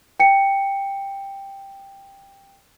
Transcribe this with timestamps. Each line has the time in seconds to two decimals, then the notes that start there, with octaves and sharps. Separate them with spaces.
0.20 G5 C#7